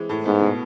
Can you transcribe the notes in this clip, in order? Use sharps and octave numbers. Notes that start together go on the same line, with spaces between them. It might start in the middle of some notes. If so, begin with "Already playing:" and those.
Already playing: E3 G#3 C4
A2
G#2 B3
B2